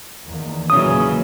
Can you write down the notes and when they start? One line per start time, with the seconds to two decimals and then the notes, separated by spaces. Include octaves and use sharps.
0.29 E2 D#3 A#3
0.70 A#2 C#3 E3 F#3 C#4 D#6